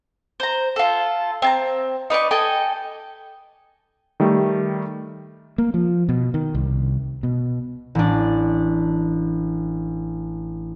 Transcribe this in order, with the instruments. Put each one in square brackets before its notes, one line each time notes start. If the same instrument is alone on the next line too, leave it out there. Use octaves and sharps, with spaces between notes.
[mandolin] C5 A#5
F4 A4
C4 A5 A#5
D#4 B4 D5 C#6
A4 D#5 G5 G#5
[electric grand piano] D#3 G3 A3
[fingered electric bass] A#3
F3
B2
D#3
C2
B2
[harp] A1 D4